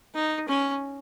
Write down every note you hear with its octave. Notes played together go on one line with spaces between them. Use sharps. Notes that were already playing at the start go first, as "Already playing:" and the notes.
D#4
C#4